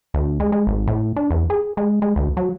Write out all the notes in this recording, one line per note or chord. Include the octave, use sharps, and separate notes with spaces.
D2
G#3
G#3
G#1
A2
D4
E2
G#4
G#3
G#3
D2
F#3